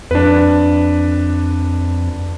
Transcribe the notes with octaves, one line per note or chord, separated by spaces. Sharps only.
F2 D4 B4